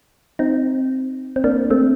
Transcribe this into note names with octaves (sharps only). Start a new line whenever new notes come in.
C4 D#4
C4
A#3 D4
A3 C4